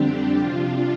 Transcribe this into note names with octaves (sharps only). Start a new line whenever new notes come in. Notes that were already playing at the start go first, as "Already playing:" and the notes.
Already playing: F2 D3 G3 C4 D4 G4
C3 F3 D4 F4